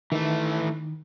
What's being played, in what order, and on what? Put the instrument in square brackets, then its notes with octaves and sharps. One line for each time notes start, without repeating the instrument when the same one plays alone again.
[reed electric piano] D#3 [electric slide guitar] E3 A3